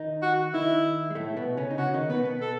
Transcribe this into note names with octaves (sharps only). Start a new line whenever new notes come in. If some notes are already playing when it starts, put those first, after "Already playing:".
Already playing: D#3 D#4
F#4
D#3 D#4 E4
G#3
A2 A3
B2 B3
C#3 C#4
D#4
C#3 C#4 F#4
D#3 D#4
B2 B3 B4
B2 B3
A4